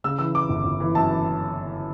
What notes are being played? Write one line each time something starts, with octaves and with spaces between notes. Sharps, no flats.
C#3 E6
E3 E6
E3 D6
G1
G1
E3
F#2 A5
E3